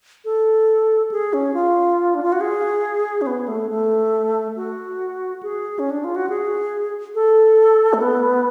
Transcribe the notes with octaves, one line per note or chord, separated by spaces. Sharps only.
A4
G#4
C#4
F4
D4
F4
F#4
G#4
C#4
B3
A3
A3
F#4
G#4
C#4
D4
F4
F#4
G#4
A4
A3
B3